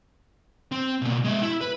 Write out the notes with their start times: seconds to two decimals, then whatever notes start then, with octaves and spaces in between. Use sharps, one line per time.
0.72 C4
1.02 B2 A#3
1.24 G#3 E5
1.42 E4
1.61 B4